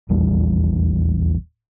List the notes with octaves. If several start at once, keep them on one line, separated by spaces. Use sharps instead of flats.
D#1 A#1 E2 G3